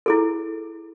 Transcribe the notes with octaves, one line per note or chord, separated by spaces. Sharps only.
E4 G#4 A4